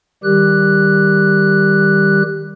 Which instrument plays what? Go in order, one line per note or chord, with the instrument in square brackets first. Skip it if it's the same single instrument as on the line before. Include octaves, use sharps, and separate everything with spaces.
[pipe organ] D#3 G3 G4 F#6